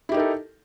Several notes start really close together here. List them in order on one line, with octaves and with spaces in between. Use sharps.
E4 G4 D#4 A#4 A4